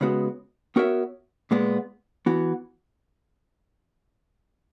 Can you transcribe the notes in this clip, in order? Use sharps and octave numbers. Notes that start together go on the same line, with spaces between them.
C#3 G#3 B3 F#4
B3 F#4 A#4 C#5 E5
A#2 G#3 B3
E3 B3 F#4